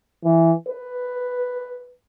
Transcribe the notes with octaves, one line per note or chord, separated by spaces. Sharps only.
E3
B4